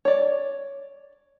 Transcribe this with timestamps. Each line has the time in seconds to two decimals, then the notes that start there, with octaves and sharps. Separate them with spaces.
0.05 C#5 D5